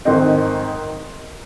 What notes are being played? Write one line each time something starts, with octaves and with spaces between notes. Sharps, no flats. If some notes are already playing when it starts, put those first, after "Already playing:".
G#2 D#3 C4 D#4